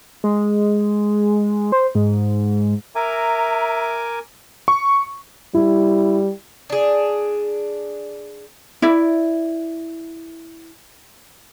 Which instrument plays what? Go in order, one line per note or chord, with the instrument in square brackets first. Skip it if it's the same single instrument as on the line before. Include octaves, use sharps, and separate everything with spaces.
[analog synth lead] G#3
C5
G#2
[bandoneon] A#4 G#5 D6 [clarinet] E5 [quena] A#5
[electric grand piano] C#6
[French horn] G3 [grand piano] E4
[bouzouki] D4 G#4
[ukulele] E4 D5 E5